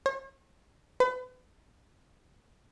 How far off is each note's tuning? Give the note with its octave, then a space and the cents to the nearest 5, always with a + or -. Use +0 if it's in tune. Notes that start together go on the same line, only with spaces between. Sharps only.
C#5 -45
B4 +40